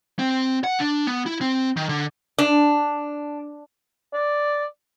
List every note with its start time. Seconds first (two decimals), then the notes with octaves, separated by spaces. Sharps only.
0.19 C4
0.64 F#5
0.80 D4
1.06 B3
1.26 E4
1.41 C4
1.77 D#3
1.89 D3
2.38 D4
4.13 D5